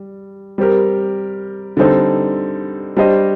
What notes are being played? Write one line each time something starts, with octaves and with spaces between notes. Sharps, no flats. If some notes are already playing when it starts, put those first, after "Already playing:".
Already playing: G3
G3 C4 G4 A#4
D3 G3 C4 D#4 A4
G3 D4 G4 C5 D#5